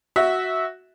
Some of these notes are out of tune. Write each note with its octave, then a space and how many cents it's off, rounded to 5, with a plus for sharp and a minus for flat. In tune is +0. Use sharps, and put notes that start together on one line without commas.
F#4 +0 E5 -15